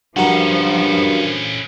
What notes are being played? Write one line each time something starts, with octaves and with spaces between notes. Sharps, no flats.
G2 F3 C#4 F#4 A4 A#4